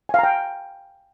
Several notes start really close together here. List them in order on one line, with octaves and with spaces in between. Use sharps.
G#5 F5 A#5 G5